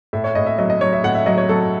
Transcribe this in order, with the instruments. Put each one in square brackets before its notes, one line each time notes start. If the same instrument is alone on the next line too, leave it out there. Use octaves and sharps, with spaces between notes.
[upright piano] A2 E5
C#5
A2 D#5
E5
F#3 D#5
D#5
F#3 C#5
E5
A2 F#5
E5
F#3 D#5
C#5
F#3 A4